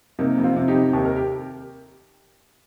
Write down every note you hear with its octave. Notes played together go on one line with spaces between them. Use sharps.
C3 A#3 D#4
F2
C4 F4
C3
D#4 G4
C3
D#2 G4
A#4
G4